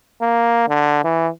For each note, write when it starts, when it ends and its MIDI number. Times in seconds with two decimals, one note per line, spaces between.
0.21 0.66 58
0.68 1.02 50
1.04 1.29 52